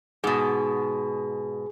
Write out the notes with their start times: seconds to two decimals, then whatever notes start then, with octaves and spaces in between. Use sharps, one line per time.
0.24 G#2 B2 G#4